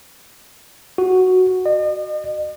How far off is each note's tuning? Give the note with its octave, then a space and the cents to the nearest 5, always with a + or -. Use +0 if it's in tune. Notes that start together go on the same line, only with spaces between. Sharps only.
F#4 +0
D#5 -45